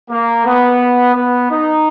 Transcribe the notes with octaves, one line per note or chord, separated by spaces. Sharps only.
A#3
B3
B3
D#4